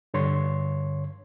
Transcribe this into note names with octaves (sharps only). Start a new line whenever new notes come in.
G2 D3 C#5 C6